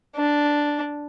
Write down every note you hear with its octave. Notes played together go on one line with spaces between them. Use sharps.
D4